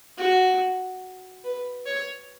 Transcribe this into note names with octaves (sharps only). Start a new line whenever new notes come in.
F#4
B4
C#5